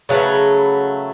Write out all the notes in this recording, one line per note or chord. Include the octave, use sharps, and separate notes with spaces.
C#3 F#3 A3 B4